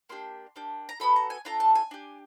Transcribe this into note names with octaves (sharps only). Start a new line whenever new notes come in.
A#3 D4 G4 C6
A#3 D4 G4
A#5
B3 D#4 F#4 A4 B5
A#5
G#5
D4 F4 A4 A#5
A5
G#5
D4 G4